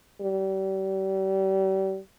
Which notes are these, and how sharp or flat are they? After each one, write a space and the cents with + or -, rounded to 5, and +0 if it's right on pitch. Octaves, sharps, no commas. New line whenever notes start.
G3 -35